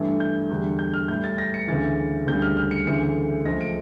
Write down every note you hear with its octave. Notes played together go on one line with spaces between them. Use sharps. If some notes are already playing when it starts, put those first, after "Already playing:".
Already playing: G2 E3 A3
G6
E2 D3 G3
G6
F6
A2 G3 G6
A6
A#6
C#7
D2 C#3 E3 A6
D2 C#3 G3 G6
F6
F6
C#7
D2 C#3 E3 A3 C#7
C#2 C#3 F3 A3 A#6
D7